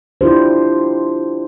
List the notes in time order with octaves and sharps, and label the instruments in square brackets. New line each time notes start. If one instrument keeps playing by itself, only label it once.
[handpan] D4 E4 F4 G4 C5